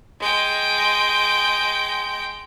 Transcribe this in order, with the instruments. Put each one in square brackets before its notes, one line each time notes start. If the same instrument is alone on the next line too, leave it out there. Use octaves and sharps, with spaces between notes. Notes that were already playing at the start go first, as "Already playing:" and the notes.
[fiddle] G#3 G5